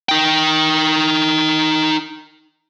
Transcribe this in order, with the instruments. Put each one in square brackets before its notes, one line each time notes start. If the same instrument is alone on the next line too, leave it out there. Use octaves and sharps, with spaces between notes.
[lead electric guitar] D#4 G5